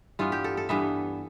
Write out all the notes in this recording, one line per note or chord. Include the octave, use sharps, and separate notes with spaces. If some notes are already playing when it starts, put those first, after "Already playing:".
G2 E3 B3 F4
G4
A4
A4
G2 E3 B3 E5